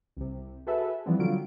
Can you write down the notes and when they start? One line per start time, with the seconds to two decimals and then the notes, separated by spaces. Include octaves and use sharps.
0.17 C2 C3
0.67 F#4 G#4 A4 B4 E5
1.06 E3 F3 G3 B3 C4
1.19 D3 F#3 G3 F4 D7